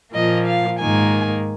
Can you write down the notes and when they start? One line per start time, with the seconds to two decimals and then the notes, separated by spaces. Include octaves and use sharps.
0.13 A#2 F3 A#3 D#5
0.47 F5
0.79 G#2 D#3 A#3 G#5